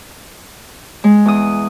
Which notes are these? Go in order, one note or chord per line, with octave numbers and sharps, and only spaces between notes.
G#3
E2 D#6